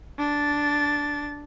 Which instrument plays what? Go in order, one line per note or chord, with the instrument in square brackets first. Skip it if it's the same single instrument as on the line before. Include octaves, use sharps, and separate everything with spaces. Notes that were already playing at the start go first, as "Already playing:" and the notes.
[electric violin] D4 A6